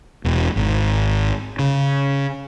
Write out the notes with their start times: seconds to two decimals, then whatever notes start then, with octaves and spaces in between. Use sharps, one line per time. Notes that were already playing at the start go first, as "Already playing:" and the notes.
0.24 E1
0.56 G#1
1.59 C#3